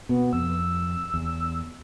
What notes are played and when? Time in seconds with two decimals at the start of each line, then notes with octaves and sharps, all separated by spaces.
0.09 B2 B3
0.33 F2 E6
1.14 E2